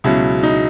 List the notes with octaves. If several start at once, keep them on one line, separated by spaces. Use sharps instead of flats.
C#2 B2 F#3 E4
D#4